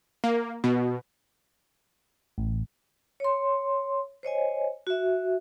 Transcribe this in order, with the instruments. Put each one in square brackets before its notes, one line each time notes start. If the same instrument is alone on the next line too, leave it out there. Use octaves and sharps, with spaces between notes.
[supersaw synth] A#3
B2
[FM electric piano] A1
[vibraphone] C#5 C6
C5 C#5 D#5 G#5
F#4 E5